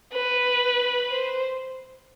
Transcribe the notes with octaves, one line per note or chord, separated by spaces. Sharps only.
B4
C5